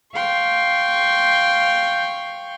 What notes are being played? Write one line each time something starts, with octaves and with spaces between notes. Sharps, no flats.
F5 G5 C6 C#6